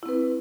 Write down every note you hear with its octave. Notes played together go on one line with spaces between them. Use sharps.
C4 E4 B4